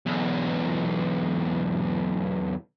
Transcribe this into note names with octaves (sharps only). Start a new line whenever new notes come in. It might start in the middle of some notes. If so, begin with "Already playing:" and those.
B1 E2